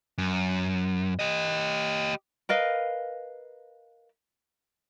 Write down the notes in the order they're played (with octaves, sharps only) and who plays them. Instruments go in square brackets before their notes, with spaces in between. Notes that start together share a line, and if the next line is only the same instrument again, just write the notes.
[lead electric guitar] F#2
G4 D#5
[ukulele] A#4 B4 D#5 F5